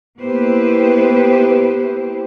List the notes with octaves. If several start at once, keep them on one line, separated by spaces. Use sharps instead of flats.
A#3 B3 E4 G4 B4 C5